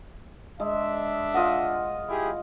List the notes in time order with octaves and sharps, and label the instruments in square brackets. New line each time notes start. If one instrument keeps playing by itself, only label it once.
[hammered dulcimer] G#3 [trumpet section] D4 E5
[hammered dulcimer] F4 D#5 F#5
[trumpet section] E4 G4 G#4